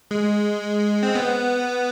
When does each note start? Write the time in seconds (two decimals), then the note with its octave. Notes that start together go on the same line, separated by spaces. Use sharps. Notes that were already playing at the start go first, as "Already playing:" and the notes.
0.11 G#3
1.03 C4
1.15 B3